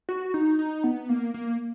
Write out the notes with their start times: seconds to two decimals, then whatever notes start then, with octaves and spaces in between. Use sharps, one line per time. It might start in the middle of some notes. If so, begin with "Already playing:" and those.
0.09 F#4
0.34 D#4
0.59 D#4
0.84 B3
1.09 A#3
1.34 A#3